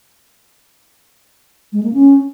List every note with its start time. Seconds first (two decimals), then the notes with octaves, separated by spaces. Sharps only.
1.73 G#3
1.83 A#3
1.94 C#4